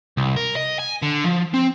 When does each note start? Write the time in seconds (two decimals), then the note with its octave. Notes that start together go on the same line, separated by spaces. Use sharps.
0.17 C2
0.36 A#4
0.56 D#5
0.79 G#5
1.02 D3
1.24 F3
1.54 C4